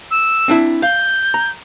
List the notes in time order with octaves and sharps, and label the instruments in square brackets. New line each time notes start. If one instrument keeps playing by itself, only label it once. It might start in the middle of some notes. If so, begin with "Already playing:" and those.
[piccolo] E6
[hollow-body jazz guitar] C4 D4 E4
[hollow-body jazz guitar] F5 [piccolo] G6
[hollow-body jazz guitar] A#5